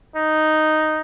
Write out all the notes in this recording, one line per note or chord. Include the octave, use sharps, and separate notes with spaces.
D#4